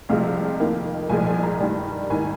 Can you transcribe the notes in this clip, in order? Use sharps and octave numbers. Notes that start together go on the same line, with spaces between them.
C2 C3 F3 G#3 F5
F2 D#3 A#3
C2 A#2 F3 G#3 G#5
G#5
A#5
G2 D#3 G3
G#1 D#3 G#5